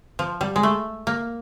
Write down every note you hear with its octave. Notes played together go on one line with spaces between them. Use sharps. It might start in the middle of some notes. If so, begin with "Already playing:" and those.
F3
G3
G#3
A3
A#3